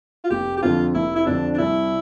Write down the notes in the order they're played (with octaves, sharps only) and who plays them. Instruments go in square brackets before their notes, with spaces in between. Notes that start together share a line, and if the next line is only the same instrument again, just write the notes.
[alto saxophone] F4
[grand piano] F1 [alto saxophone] G4
[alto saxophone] G4
[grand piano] F2 D3 F3 [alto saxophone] F4
[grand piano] F1 [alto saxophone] E4
[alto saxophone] E4
[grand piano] F2 D3 F3 [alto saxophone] D4
[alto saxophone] D4
[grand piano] C2 [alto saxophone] E4